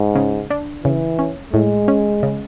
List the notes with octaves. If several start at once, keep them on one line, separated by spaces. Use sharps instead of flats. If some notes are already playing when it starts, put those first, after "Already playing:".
Already playing: G#2
C#3
D4
C#3 E3
C#4
A2 G#3
C#4
C#3